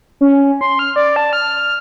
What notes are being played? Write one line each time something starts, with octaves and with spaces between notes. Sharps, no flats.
C#4
C6
F6
D5
A5
F6